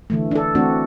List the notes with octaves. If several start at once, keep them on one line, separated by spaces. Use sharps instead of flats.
D3 E3 A3
D4 A4
E3 A3 C4 D4 F#4